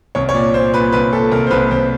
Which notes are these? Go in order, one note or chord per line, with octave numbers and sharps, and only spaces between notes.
C2 C#5
C#5
A#2 D5
A#2 C5
A#2 B4
C2 B4
A#2 A4
C2 A#4
C5
C2 B4
C2 C5